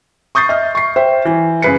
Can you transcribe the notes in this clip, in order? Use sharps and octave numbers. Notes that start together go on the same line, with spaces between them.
C#6 D#6 G6 A6 C7
D#5 E5 F6
C#6 C7
C5 E5 G5
E3
F#2 C#3 B4 C7 C#7